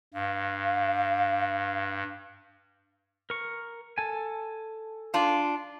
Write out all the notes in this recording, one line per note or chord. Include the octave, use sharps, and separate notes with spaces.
G2 F5
A#4 C#6
A4 G#5
D4 F4